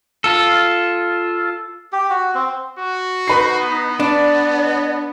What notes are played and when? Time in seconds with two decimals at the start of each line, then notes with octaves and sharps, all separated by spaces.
0.24 F4 A4
1.92 G4
2.10 F#4
2.35 C4
2.78 F#4
3.28 D#4 B4 C7
3.60 B3
4.00 D4 D5